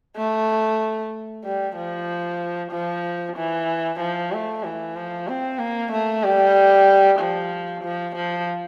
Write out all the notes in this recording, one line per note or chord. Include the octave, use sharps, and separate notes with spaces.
A3
G3
F3
F3
E3
F3
A3
E3
F3
C4
A#3
A3
G3
F3
F3
F3